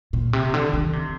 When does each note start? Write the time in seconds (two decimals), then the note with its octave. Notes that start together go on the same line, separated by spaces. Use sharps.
0.13 A#2
0.33 C3
0.54 D3
0.74 D#3
0.93 C3